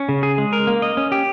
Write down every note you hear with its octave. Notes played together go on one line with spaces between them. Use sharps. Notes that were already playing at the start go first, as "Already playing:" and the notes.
Already playing: C#4
C#3
G#4
G#3
A#4
A#3
D#5
C#4
G4